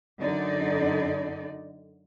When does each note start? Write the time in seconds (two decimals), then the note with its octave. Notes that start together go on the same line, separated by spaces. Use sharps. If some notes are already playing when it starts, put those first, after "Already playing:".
0.18 F#2 D3 D#4 D5